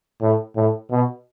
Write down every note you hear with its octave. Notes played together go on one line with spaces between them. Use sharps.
A2
A2
B2